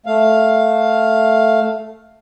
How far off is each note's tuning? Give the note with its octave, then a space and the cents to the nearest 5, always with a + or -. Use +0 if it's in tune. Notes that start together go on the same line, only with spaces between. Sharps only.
A3 +0 F5 +5